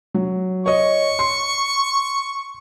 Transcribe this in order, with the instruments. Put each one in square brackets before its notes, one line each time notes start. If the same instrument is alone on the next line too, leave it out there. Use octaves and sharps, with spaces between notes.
[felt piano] F#3
[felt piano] C#5 D#5 [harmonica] C#6
[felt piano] C6